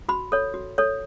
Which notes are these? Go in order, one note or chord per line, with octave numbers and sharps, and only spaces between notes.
F#4 B5
A4 C#5
F#4
A4 C#5